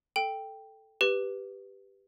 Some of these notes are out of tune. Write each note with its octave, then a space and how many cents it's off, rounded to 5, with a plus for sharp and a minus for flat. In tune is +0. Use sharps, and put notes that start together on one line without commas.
A4 +0 G5 +0
G4 +0 B4 +0